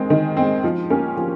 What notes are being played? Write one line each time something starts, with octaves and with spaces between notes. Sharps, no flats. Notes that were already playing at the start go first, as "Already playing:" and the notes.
Already playing: D#3 G#3 C4
D#3
G#3 C4
F3
A#3 C#4 G4
F3